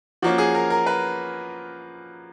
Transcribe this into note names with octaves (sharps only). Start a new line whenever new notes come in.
F3 A#3 C#4 F#4
G#4
A#4
A#4
B4